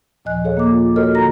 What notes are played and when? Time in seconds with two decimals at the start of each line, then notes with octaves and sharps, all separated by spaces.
0.25 D#2 A#2 F3 D#5 G#5 F#6
0.44 G#4 A4 C#5 D#5 F5
0.57 A#3 D6
0.71 F4
0.96 F#4 A4 A#4 C#5 D#5 F6
1.15 D3 D#4 A#5 A#6